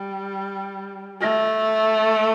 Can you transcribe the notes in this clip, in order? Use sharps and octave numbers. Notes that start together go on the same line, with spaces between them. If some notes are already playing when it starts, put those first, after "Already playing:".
Already playing: G3
A3